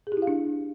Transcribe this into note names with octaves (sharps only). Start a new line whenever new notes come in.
G#4
G4
E4
F5
D4